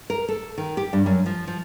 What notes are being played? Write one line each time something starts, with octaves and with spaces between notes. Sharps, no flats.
A#4
A4
D#3
G4
G2
F#2
F3
F3